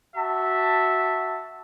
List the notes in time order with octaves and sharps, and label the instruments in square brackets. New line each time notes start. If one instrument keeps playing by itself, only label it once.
[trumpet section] F#4 E5 A5